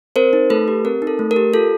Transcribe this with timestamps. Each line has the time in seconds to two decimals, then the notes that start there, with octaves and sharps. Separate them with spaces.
0.16 C4 A#4 C5
0.33 D#4
0.50 A3 A4 B4
0.68 G4
0.85 C4 A#4
1.02 D#4
1.07 A4
1.19 A3
1.31 A#4
1.36 G4
1.54 F4 A4